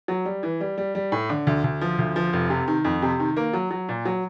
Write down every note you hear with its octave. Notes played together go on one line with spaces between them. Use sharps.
F#3
G3
E3
G3
G3
G3
A2
D3
D2
D2
F3
D2
F3
F1
C3
D#3
F2
C3
D#3
A#3
F#3
F#3
A#2
F#3